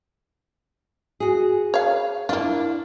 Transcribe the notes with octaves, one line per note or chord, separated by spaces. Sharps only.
F#4 G#4
C#5 F5
A#3 D4 E4 F4